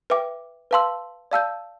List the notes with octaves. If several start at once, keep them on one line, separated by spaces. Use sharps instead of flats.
B4 E5 G5 D6
B4 F5 A5 C6 E6
D5 F5 A5 E6 G6